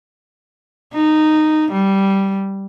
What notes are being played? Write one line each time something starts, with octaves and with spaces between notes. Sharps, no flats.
D#4
G3